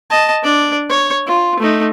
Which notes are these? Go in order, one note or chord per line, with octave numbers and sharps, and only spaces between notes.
D#5 A5
D4 D5
C#5
F4
A3 D#4